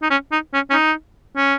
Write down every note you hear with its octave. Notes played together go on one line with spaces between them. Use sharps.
D#4
C#4
D#4
C#4
C#4
D#4
C#4